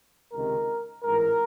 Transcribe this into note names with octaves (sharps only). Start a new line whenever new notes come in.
C#2 C3 D#3 A#4
A1 G#2 E3 A#4